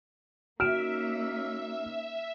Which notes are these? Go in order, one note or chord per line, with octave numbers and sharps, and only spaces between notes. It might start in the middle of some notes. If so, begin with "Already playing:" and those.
A#3 C#4 D#4 F#4 E5 F6 D7 E7